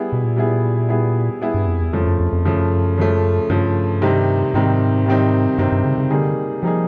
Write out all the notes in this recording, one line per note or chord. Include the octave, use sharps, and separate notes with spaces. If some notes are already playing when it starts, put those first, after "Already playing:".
Already playing: G3 B3 E4 G#4
B2
A#2
G3 B3 E4 G#4
G3 B3 E4 G#4
G3 B3 E4 G#4
G2
F2
E2
F2 C#3 F3 A3
F#2
F2
F2
F#2 C#3 F3 A3
C#3 F3 A3
G2 C#3 F3 A3
C3 D#3 G3 C4 D#4
G#2 C3 D#3 G3 C4 D#4
C3 D#3 G3 C4 D#4
G2 C3 D#3 G3 C4 D#4
G2
C#3
C#3
D3 G3 A#3 D#4 G#4
F3 G3 A#3 D#4 G#4